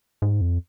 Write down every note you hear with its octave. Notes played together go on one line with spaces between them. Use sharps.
G#2
F2